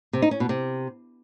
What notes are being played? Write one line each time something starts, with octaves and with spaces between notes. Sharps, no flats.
C3
D#4
C#4
B2
C3